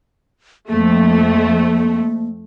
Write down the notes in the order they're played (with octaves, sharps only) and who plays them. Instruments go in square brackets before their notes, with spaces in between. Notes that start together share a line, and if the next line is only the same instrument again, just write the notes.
[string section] F2 A3 [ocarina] A#3